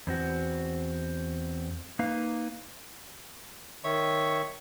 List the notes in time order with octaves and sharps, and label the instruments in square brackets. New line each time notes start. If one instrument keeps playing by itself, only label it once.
[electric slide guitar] E2 C4 F#4
A#3 D#4 B4 F5
[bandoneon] D#3 E5 [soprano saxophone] C#5